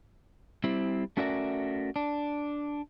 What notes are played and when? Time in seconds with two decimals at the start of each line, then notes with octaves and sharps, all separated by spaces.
0.64 G3 C4 E4
1.17 A3 C#4 F#4 A#4 D5 E5
1.96 D4